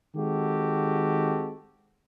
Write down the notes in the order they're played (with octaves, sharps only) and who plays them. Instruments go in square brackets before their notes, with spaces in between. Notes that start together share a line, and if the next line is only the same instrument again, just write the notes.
[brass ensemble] D#3 G#3 C4 F#4 G4 A4